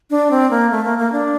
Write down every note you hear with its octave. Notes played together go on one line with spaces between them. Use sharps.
D4
C4
A#3
A3
A#3
A#3
D4